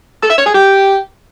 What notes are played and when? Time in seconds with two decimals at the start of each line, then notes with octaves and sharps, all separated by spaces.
0.22 A4
0.30 E5
0.38 C#5
0.46 G#4
0.54 G4